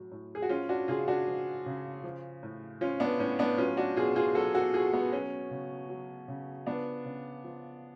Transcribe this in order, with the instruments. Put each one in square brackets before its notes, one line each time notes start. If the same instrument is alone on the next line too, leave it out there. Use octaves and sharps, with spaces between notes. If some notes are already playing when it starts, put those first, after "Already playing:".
Already playing: [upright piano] A2 F#3
A2
G#4
F#4
F3 C#4 F4
D4 F#4
C#3 F4 G#4
D4 F#4
F3
C#3
F3
A2
F3 C#4 F4
B3 D4
A2 C#4
B3 D4
F#3 C#4 F4
D4 F#4
B2 F4 G#4
F4 G#4
F#3 F#4 A4
F#4 A4
B2 F4 G#4
B3
F#3 C#4
C#3
F#3
C#3
F3 B3 D4
C#3
F3